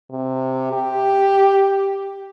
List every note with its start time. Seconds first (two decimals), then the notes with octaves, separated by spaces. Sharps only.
0.10 C3
0.72 G4